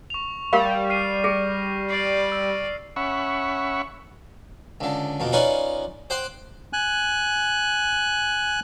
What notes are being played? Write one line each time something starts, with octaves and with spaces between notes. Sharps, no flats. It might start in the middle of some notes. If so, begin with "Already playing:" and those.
C#6 F7
G3 G4 A#4 F5
F6 C7 D#7
G#4 A#6
D5 C7
E6
C#4 E5 F#5 B5 C#6
C#2 D3
F2 B2 A#3
C#4 D#4 F4 B4 C#5 D5
C5 F#5 G5 C6 D6
G#5 F#6